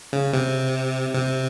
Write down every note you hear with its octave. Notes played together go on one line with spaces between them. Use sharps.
C#3
C3
C3